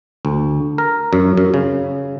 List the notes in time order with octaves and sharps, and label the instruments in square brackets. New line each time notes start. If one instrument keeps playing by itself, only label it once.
[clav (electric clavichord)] D2
A#4
F#2
F#2
C#3